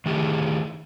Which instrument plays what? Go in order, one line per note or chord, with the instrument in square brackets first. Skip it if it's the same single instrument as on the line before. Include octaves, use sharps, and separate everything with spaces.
[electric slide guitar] D#3 A3 G4 G#4